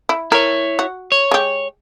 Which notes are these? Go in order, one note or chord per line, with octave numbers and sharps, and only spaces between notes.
E4
E4 A#4 C#5
F#4
C#5
G#3 G4